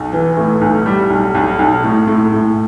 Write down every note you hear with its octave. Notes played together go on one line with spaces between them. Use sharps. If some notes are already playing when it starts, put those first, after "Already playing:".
Already playing: B1
E3
A2
B1
G3
B1
B1
B1
A2
A2
A2